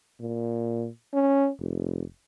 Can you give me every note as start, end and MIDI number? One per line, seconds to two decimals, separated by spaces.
0.20 0.88 46
1.13 1.49 61
1.60 2.03 29